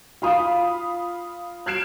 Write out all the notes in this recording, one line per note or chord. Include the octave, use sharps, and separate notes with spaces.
F4 F5 B5 D#6
F6 F#6 G#6 C7 D7 E7